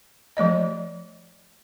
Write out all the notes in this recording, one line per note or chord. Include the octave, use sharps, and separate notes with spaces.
F3 A3 D5 D#5